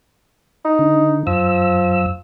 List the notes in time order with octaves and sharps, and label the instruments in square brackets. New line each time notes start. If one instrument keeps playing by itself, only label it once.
[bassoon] D#4
[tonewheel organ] D3
[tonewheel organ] F#2 E6 [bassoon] F3